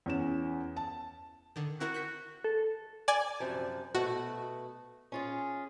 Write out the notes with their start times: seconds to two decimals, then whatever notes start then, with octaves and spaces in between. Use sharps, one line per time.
0.06 E2 C#4 E7
0.76 A5
1.56 D3 D#3
1.80 C4 E4 F#4 A#4
1.94 F#6 G6 B6
2.44 A4
3.08 D5 G#5 G#6
3.40 F#2 C3 F3
3.95 B2 A3 F#4
5.12 C#4 F4 G#4